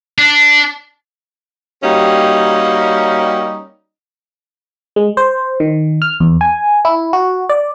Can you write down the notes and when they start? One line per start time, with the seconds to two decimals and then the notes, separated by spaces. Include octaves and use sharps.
0.19 D4
1.83 G3 A#3 C#4 D#4 F#4 G4
4.96 G#3
5.17 C5
5.60 D#3
6.02 F6
6.20 E2
6.41 G#5
6.85 E4
7.13 F#4
7.49 D5